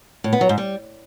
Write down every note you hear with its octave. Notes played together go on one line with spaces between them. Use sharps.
A2
B3
F#3
G#2
G3